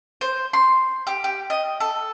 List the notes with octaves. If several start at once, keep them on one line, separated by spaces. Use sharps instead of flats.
C5
C6
G4
G4
D#5
A4